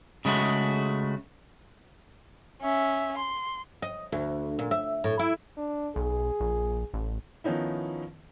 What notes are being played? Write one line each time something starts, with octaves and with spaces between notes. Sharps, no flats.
C#3 G#3 A3 F#4
C#4 E5
C6
D#5
D2
A#2
E5
A2
E4
D4
B1 G#4
A#1
A1
D#3 F3 B3 C#4 D#4 E4